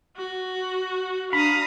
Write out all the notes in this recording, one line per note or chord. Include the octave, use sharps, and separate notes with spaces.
F#4
D4 F5 A#5 B5 D#6